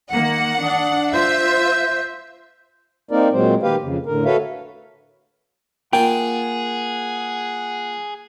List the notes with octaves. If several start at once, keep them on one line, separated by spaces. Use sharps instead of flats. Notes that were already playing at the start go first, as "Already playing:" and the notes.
D#3 A#3 F#5 C#7
D4 D#6
F4 C5 E5 G6
A#3 C4 D#4 A#4 D5
A#2 F#3 G#3 C4 C5
D#3 A#3 G4 B4 F5
F2 C#3
A2 D3 A#4
F#4 A4 B4 C#5 E5 F5
A#3 F4 G#4 F#5 G5